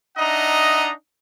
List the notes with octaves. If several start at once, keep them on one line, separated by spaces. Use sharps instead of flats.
D4 D#4 D#5 E5 F#5 A#5